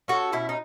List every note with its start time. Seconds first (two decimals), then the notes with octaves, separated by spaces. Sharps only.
0.08 C#4 F#4 A4
0.33 B2 E4
0.49 D#4